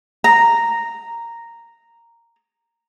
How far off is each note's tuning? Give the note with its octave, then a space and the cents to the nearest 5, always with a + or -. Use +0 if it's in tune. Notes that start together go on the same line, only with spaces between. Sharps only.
A#5 -5